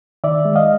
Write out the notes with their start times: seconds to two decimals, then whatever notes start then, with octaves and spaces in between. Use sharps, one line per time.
0.24 D#3 D5 E5
0.45 G#3
0.56 D#5 F5